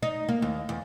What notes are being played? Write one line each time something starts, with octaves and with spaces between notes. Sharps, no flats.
D#4
A#3
D#2
E2